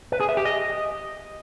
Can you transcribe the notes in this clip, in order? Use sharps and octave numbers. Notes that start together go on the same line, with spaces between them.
B4
G#4
E5
G4
D#5